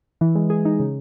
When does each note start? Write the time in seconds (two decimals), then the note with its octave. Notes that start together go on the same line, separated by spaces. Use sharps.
0.21 E3
0.35 G#3
0.50 G#4
0.65 D#4
0.80 C#3